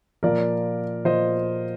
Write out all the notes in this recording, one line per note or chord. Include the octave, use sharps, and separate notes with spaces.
A#2 F3 A#4 D5
A#2 F3 C5 D#5